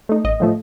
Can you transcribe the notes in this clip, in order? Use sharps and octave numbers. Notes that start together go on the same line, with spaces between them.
A3 D#4
A1 D#5
A2 F3 A3